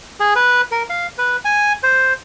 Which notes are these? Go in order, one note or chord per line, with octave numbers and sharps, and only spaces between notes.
G#4
B4
A#4
F5
B4
G#5
C5